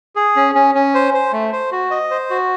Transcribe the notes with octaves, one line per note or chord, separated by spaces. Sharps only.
G#4
C#4
C#4
C#4
C5
C5
A3
C5
F#4
D#5
C5
F#4